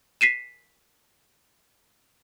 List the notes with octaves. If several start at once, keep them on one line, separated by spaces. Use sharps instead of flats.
B6 C7 D#7 E7